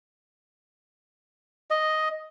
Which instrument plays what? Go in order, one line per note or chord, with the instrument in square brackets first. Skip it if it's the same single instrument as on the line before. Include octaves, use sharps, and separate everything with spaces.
[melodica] D#5